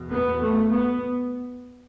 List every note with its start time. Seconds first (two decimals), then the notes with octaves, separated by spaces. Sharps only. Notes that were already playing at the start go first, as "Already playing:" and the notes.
Already playing: E2 B2
0.10 B3
0.39 A3
0.69 B3